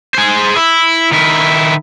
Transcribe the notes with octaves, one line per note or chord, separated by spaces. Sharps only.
G#4 C5
E4
D#3 E4